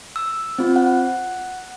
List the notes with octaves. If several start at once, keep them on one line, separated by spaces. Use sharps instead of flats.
E6
C4 F4
F#5